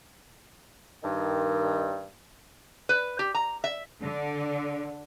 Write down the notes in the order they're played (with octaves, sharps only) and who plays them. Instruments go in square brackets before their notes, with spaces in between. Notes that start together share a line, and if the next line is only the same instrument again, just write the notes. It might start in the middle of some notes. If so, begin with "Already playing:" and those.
[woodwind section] G2 D#3
[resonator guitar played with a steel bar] B4
G4
A#5
E5
[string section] D3